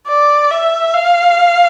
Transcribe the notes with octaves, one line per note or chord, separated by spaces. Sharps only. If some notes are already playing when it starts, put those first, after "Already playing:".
D5
E5
F5